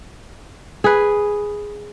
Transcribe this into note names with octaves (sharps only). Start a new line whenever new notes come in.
G#4 B4